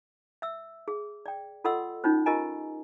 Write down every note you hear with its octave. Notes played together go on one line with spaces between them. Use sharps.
E5 E6
G#4
D5 G5
F4 A4 D#5 F#5 C6 E6
C#4 D#4 F4 C5
F4 G4 A#4 D#5 G#5 A#5